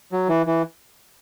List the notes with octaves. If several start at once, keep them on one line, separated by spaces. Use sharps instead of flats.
F#3
E3
E3